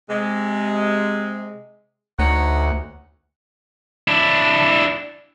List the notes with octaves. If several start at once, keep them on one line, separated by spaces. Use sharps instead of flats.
C3 G#3
D2 D#4 C#5 F#5
D4 E4